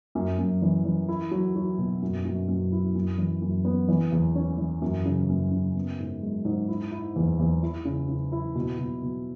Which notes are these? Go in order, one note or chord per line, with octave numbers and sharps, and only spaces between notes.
F#2
F#2
E3
E3
E4
F#3
F#3
B2
F#2
F#2
F#2
E4
F#2
E3
F#2
B3
E3
E2
C#4
E3
F#2
C#3
F#2
C#3
B3
G#2
G#3
G#2
E4
E4
E2
E2
E4
C#3
C#3
E4
B2
B2
B2